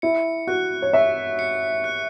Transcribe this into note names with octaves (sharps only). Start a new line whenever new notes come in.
E4 C#7
F#4 F#6
C#5
E5 C#6
C#7
F#6